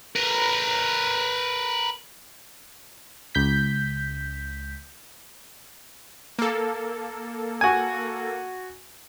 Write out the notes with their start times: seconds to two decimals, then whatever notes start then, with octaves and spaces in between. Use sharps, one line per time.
0.16 A#4 B4
3.35 C#2 G6 B6
6.39 A#3 A4
7.61 F#4 G#5